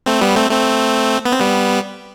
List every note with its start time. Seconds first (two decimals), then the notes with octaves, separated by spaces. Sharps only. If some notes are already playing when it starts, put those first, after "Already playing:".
0.06 A3 C4
0.21 G3 B3
0.36 A3 C4
0.50 A3 C4
1.25 B3
1.32 C4
1.40 G3 B3